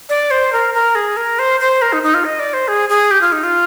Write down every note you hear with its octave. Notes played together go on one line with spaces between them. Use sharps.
D5
C5
A#4
A#4
G#4
A#4
C5
C5
A#4
D#4
D#4
F4
D#5
D5
C5
G#4
G#4
G4
F4
D#4
F4